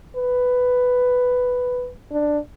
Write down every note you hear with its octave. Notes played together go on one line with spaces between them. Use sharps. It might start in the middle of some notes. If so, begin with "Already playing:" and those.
B4
D4